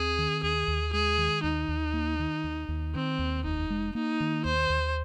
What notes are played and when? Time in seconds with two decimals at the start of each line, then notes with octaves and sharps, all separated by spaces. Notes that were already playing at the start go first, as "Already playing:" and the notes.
Already playing: D#2 C4 G#4
0.18 D#3
0.43 D#2 G#4
0.68 D#2
0.93 G#3 G#4
1.18 D#3
1.43 D#2 D#4
1.68 D#2
1.93 A#3
2.19 D#3
2.44 D#2
2.69 D#2
2.94 D#3 C4
3.19 D#2
3.44 F1 D#4
3.70 G#3
3.95 A#3 D#4
4.20 D#3
4.45 D#2 C5
4.70 D#2